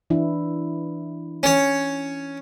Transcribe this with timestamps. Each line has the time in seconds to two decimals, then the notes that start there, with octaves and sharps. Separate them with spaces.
0.10 E3 D4 E4
1.43 C#4 C#5